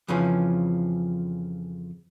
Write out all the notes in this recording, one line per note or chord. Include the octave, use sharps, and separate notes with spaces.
F2 C#3 E3 F3 C#4